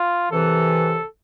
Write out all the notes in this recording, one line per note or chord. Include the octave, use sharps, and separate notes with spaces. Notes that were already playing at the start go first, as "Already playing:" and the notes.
Already playing: F4
C2 C3 E3 A4